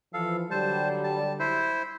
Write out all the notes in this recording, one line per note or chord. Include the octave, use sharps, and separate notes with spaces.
E3 F3 A4 F5
D3 F#3 G3 C5 A5
A5
E4 C5